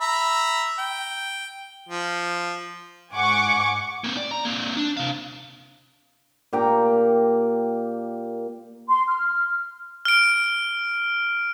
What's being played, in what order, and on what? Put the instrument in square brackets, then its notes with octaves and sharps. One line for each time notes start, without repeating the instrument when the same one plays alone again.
[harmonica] E5 A#5 B5
G5
F3
[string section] G#2 F#5 G#5 C#6 D6
[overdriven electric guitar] A#3 C4
D5
A#5
A#3 C4
D4
C3 F5
[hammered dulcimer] A#2 G4 G5 A#5
[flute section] C6
F6
[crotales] F6 D7